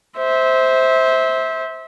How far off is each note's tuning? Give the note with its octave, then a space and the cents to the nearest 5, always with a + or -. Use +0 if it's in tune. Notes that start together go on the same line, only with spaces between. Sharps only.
C5 +0 E5 -25